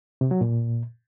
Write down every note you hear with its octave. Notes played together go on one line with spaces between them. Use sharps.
C3
F#3
A#2